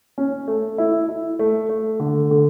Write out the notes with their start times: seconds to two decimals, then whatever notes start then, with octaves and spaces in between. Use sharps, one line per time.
0.18 C#4
0.48 A3
0.78 E4
1.09 E4
1.39 A3
1.69 A3
2.00 D3
2.31 D3